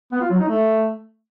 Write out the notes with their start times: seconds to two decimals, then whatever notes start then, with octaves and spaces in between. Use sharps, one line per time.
0.12 B3
0.21 F4
0.30 F#3
0.39 D#4
0.48 A3